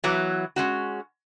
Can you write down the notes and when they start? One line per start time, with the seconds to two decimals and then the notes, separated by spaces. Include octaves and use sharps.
0.04 E3 F#3 B3
0.56 G#3 C#4 F#4